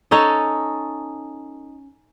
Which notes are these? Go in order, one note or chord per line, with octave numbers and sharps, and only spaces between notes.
C#4 D#4 A4 D#5